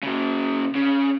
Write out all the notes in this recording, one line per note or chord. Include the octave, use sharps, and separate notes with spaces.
C#3 F#3
C#3